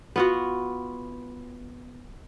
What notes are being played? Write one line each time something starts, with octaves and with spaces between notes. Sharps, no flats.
B3 F4 F#4